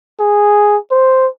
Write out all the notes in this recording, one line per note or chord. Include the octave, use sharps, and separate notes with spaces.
G#4
C5